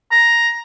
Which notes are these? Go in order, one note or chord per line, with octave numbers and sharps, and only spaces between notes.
A#5